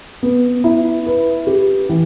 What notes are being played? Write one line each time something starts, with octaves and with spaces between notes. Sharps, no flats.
B3
E4
B4
G4
E3